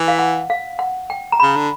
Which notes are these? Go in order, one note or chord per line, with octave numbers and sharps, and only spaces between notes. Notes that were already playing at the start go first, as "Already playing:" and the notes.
Already playing: E3
F5
F#5
F5
F#5
G5
A#5
C#3 B5
D3